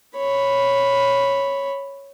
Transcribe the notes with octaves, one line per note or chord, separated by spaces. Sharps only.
C#5 B5